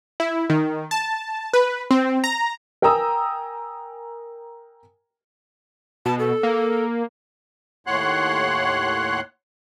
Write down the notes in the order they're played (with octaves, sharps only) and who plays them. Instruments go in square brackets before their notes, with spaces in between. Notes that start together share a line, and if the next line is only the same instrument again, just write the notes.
[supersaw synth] E4
D#3
A5
B4
C4
A#5
[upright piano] A#4 G5 G#5 A#5 D#6 E6
[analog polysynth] B2 [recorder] A5
[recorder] A4
[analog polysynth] A#3
[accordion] D#2 A2 C#5 F#5 C6 F#6